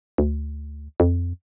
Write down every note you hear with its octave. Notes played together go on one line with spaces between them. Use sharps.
D2
F2